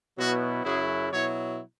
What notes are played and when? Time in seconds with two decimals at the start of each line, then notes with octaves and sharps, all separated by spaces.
0.18 B2 F#3 B3 E4 F#4
0.64 F#2 C#3 F#3 E4 G#4
1.12 B2 F#3 E4 C#5